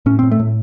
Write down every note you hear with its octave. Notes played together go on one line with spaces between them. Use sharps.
A2 C#4
C4
A2
A3
A2